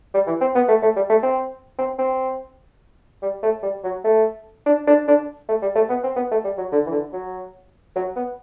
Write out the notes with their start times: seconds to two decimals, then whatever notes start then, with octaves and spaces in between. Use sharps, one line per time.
0.14 G3
0.27 E3
0.41 C4
0.55 B3
0.68 A3
0.82 A3
0.96 G3
1.09 A3
1.23 C4
1.78 C4
1.98 C4
3.22 G3
3.43 A3
3.63 G3
3.84 F#3
4.04 A3
4.66 D4
4.87 D4
5.08 D4
5.48 A3
5.62 G3
5.75 A3
5.89 B3
6.03 C4
6.16 B3
6.31 A3
6.44 G3
6.58 F#3
6.72 D3
6.86 E3
6.92 D3
7.13 F#3
7.96 F#3
8.16 B3